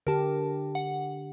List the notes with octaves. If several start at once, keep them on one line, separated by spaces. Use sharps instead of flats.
D3 G4 A#4 A5
F#5